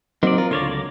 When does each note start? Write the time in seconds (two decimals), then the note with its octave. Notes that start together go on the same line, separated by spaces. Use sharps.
0.23 F#3 A#3 C4 D#4 D5
0.38 F4 A#4
0.51 C#2 D3 F4 C#5 D5 A#6
0.68 F#3 D6